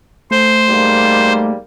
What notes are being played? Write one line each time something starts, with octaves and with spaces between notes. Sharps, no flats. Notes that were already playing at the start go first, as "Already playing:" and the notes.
A3 C5
G#2 G3 A#3